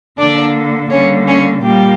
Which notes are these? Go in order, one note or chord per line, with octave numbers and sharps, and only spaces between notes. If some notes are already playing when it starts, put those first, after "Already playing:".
D3 A#3 D4 D5
D3 G3 A#3 C#4 C#5
C#4 C#5
A#2 G3 A#3 G4